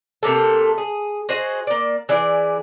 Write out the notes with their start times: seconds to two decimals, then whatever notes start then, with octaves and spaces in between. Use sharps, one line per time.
0.23 C3 A3 A#3 A4
0.78 G#4
1.29 F#4 G#4 C5 D#5
1.67 A#3 D5
2.09 E3 E4 G#4 D5